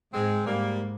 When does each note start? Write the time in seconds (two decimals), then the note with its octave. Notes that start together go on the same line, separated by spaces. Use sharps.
0.13 G#2 G#3 C4
0.45 G#2 G3 A#3